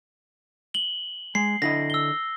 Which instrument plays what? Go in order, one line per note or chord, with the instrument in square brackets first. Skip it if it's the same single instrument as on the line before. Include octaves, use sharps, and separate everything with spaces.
[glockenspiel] F#7 G7
[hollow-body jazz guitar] G#3 [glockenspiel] C7
[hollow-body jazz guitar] D3 E4 D#5 [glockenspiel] A#6
[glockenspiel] E6 G7